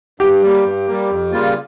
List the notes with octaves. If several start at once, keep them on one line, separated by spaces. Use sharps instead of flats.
G2 G4
G3 A#3
G2
G3 A#3
F2
C#3 G3 A#3 F4